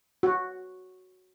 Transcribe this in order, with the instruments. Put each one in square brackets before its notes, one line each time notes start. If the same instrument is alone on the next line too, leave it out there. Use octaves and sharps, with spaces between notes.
[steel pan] F#4